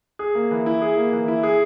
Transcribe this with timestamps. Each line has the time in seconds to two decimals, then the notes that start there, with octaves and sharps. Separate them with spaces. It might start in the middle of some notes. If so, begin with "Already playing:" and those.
0.19 G#4
0.35 A#3
0.51 E3
0.66 E4
0.82 G#4
0.97 A#3
1.13 E3
1.28 E4
1.43 G#4